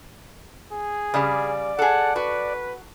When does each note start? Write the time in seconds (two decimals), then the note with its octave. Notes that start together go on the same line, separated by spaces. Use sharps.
0.72 G#4
1.14 C#3 G3 D5
1.79 G#4 A4 F#5
2.16 F#4 B4